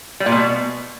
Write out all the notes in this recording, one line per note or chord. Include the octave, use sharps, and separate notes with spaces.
G3
A#2
B2